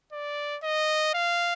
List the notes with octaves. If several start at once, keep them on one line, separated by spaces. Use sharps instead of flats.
D5
D#5
F5